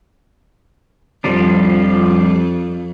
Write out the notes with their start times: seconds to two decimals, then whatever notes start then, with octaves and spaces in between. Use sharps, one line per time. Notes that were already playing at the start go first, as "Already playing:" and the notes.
1.24 F2 F3 G3 D4